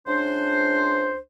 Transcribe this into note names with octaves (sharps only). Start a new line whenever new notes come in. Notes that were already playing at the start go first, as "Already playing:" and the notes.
C#2 D4 C5